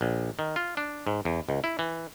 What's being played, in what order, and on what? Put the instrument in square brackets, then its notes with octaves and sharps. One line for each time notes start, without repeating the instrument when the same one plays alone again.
[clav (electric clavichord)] A#1
D#3
F4
D4
G#2
E2
C#2
E4
E3